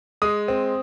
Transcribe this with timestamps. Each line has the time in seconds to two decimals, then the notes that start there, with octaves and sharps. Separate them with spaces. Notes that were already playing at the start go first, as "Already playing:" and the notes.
0.22 G#3 D#6
0.48 C4